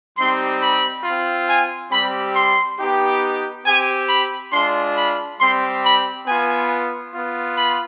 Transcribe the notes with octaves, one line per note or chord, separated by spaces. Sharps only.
G3 C4 D#4 G4 C6
B5
F4
C4
G#5
G3 C4 G4 B5
C6
B3 D#4 G4
C4 G4 G#5
B5
G#3 D4 F4 C6
B5
G3 C4 G4 C6
B5
B3 F4 G#5
B3 F4
B5